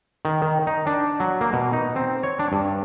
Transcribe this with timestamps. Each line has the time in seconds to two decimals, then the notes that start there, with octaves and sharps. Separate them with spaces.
0.25 D#3
0.42 D#3
0.67 D#4
0.87 D4
1.20 F#3
1.41 A#3
1.53 B2
1.73 D#4
1.96 C4
2.23 C#5
2.39 D4
2.52 G2